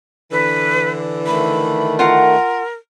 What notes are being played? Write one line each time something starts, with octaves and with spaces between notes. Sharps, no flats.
D3 E3 B4
D#3 A3 B5
F4 A#4 F#5